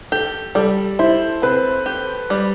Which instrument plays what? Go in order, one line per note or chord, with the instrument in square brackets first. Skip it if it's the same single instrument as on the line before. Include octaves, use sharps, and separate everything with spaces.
[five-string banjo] G4 [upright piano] A4
[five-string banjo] G3 [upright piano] A4
[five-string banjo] E4 [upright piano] C5
[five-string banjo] C4 [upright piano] B4
[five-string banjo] G4
G3